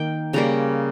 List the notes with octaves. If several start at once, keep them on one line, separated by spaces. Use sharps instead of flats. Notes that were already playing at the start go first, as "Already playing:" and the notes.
Already playing: D#3 A#3 G5
C#3 G3 A#3 A#5